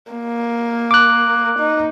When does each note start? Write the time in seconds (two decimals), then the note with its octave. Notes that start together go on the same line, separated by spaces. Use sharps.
0.12 A#3
0.91 D6 F#6
1.59 D#4